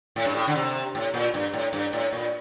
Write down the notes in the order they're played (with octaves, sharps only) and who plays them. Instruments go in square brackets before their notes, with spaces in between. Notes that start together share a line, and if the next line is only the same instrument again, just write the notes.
[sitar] A2
G2
A2
D3
C3
A2
A#2
G2
A2
G2
A2
A#2